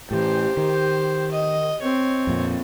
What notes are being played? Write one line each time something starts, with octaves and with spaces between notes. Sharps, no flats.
A2 E3 G4 C5
D#3
D#5
C4 C#5
F2 A#2